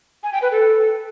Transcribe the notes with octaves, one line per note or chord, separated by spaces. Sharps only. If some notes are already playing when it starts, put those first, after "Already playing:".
G#5
G5
B4
A4